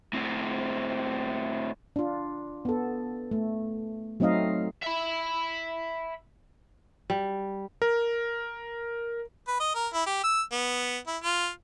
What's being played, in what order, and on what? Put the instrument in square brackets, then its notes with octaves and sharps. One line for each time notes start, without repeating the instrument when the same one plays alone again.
[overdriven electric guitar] A2 C4
[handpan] D4 F4
B3 A4
A3
F#3 A3 C4 D#4 D#5 F5
[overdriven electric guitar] E5 B5
[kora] G3
[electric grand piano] A#4
[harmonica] B4
D#5
A#4
E4
G4
E6
B3
E4
F4